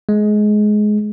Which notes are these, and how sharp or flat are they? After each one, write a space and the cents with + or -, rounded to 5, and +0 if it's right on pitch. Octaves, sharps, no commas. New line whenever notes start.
G#3 +20